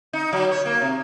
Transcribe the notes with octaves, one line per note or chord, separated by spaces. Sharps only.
D#4
F#3
C#5
A#3
C3